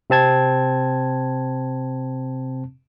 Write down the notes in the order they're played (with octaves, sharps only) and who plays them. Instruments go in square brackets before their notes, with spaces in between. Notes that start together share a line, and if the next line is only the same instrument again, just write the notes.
[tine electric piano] C3 C4 A5 G#6